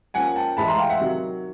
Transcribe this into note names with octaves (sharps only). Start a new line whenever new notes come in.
F3 A#3 C#4 F#5 G#5
G5 A5
A2 E3 G#3 A5 B5
A#5 C6
F5 G5
E5 F#5
C3 D#3 F#3